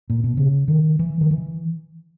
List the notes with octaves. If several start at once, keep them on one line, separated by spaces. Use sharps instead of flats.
A#2
B2
C#3
D#3
E3
D#3
E3